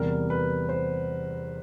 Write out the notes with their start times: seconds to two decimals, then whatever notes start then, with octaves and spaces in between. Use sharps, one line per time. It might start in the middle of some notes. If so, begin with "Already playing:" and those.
Already playing: E2 C3 E3 G3 A#4
0.30 B4
0.69 C5